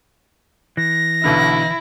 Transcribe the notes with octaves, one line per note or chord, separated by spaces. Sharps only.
E3 A#6
B1 B2 D3 E4